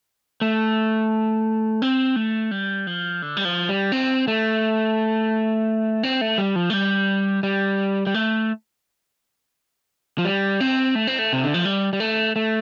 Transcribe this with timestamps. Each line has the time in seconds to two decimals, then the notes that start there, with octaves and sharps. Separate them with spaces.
0.41 A3
1.82 C4
2.16 A3
2.51 G3
2.87 F3
3.22 D3
3.37 G3
3.45 F3
3.69 G3
3.92 C4
4.28 A3
6.03 C4
6.21 A3
6.38 G3
6.56 F3
6.70 A3
6.73 G3
7.43 G3
8.07 G3
8.14 A3
10.18 F3
10.25 G3
10.60 C4
10.95 A3
11.07 C4
11.19 A3
11.33 C3
11.43 D3
11.54 F3
11.65 G3
11.93 G3
12.00 A3
12.36 A3